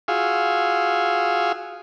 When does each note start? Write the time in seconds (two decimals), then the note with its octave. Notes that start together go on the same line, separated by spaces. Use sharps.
0.08 F4 F#4 G#4 F5 E6